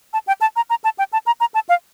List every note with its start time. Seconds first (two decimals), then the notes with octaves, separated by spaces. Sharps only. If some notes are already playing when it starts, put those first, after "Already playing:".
0.13 A5
0.27 G5
0.41 A5
0.56 A#5
0.70 A#5
0.84 A5
0.99 G5
1.13 A5
1.27 A#5
1.40 A#5
1.54 A5
1.69 F5